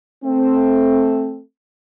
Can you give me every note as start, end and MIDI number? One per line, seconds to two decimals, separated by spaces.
0.25 1.40 57
0.25 1.40 60